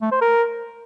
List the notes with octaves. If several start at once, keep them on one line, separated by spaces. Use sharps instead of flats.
A3
C5
A#4